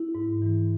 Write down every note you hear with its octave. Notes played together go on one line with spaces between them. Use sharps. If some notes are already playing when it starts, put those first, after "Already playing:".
Already playing: E4
G#2
E3